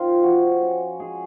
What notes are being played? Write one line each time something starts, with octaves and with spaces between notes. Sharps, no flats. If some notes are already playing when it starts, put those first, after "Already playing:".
Already playing: D#3 C4 F4
F3 F#4
C#4
G#3 G#4